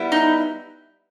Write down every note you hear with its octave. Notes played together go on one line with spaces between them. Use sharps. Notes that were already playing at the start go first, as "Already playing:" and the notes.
Already playing: G3 B3 E4
D#4